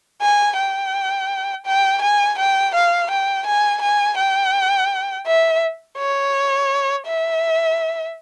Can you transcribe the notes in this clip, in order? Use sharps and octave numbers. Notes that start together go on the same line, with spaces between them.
G#5
G5
G5
G#5
G5
F5
G5
G#5
G#5
G5
E5
C#5
E5